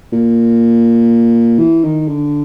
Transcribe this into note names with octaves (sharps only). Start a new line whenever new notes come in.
A#2
E3
D#3
D3